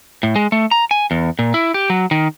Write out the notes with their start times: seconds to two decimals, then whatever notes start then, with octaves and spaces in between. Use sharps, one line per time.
0.23 A2
0.36 G#3
0.52 A3
0.71 A#5
0.91 G#5
1.11 E2
1.39 A#2
1.54 E4
1.74 G4
1.90 F#3
2.11 D#3